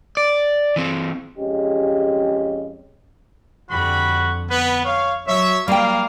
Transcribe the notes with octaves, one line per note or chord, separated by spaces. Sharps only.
D5
E3 C4
F2 G#3 C#4 G4 G#4 D#5
F2 D3 G3 F#4 B5
B3 B4
C#5 F5
F#3 C#5 E5
G3 A#3 F5 G5